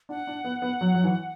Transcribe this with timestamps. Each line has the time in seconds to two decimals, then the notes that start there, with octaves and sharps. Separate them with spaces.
0.09 D4 F#5
0.27 D4
0.44 B3
0.62 B3
0.81 F#3
0.94 F#3
1.04 E3